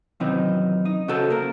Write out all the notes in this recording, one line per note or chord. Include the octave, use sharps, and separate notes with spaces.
F#2 C3 D#3 E3 C4 D#4
D#4
C#3 F#4 A4 C5 A5
A#3 A#4